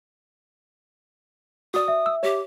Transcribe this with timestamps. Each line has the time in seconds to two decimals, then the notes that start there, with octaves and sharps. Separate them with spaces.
1.74 F#4 D5 D#6
1.88 E5
2.06 E6
2.23 G4 C#5